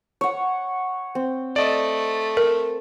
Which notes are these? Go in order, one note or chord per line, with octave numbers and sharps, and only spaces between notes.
C#5 F#5
C4
A3 D5 D#5
A#4